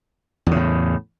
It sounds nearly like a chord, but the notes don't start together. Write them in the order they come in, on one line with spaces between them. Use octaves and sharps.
E2 C#3 A2